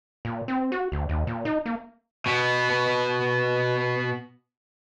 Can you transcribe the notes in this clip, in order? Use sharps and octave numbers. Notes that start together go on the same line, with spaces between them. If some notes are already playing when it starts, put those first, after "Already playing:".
A#2
C4
F#4
D2
D#2
A#2
D#4
A#3
B2 B3